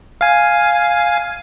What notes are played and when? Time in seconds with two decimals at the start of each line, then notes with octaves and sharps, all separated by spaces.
0.21 F5 G#5